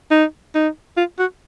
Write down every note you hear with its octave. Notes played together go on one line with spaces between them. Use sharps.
D#4
D#4
F4
F#4